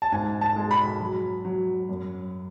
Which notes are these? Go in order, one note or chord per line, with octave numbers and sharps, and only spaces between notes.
A5
G#2 G#5
A5
G#3
B5
F#3
F#3
F#2